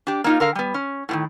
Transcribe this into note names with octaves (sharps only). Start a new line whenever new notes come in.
D4 G4
A#3 D#4 F4
D3 A#4 F5
G3 B3
C#4
A2 C3 D#3